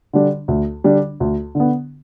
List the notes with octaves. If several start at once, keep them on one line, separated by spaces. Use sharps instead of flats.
D3 G3 D4
D2
D3 G3 D4
D2
D3
B3